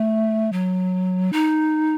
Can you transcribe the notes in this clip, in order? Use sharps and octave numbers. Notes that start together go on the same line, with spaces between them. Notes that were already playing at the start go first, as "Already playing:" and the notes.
Already playing: A3
F#3
D#4